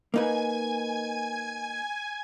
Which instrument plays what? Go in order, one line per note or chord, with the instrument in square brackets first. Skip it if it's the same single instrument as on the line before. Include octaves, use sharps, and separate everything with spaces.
[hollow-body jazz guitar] A#3 D#4 B4 [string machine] G#5 G#6